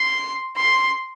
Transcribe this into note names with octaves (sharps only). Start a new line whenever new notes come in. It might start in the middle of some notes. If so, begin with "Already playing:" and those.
Already playing: C6
C6